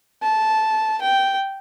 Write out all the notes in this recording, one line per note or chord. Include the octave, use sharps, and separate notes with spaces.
A5
G5